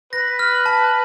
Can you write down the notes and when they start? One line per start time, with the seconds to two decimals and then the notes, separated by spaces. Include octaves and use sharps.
0.13 B4 A#6
0.39 F6
0.66 A5